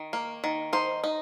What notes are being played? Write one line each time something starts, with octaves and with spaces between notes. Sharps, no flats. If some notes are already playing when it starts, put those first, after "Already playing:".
Already playing: D#3
A#3
D#3
D#4 C5
D#4